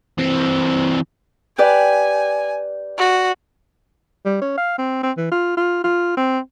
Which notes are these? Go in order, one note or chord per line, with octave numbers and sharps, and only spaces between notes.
E3 C4
G4 B4 D5 G#5
F#4
G3
C#4
F5
C4
C4
E3
F4
F4
F4
C4